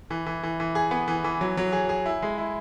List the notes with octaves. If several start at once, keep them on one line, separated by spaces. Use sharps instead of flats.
E3
E3
E3
E3
G#4
B3
E3
E3
F#3
F#3
G#4
G#4
E4
G#3
E4